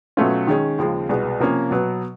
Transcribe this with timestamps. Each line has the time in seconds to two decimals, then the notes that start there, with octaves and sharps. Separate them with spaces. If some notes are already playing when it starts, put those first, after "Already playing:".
0.17 B2 F#3 A3 C#4 F4
0.47 D#3 G#3 C#4
0.78 D#2 C#3 F3 G#3
1.09 C2 B2 G#3 B3
1.40 C3 F3 A#3 C#4
1.71 B2 F#3 B3